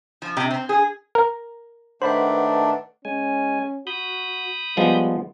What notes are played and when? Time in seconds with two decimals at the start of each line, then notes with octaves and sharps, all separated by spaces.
0.22 F3
0.37 C3
0.50 C4
0.69 G#4
1.15 A#4
2.02 D#3 A3 D4 B4 C5 F#5 B5
3.05 G#3 C#4 G#5
3.87 F#4 B5 D#6 G6
4.77 F3 G3 G#3 B3